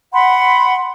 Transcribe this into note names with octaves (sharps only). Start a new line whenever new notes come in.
F#5 B5 C6